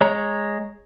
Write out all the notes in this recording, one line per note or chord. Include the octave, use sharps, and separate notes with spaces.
G#3 C#5 A#5